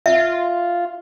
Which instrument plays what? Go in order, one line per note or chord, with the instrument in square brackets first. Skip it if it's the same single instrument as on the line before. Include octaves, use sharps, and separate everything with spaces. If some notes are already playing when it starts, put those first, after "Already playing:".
[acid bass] F4 [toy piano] E5